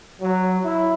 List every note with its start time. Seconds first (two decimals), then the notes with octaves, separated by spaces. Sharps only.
0.21 F#3
0.65 E4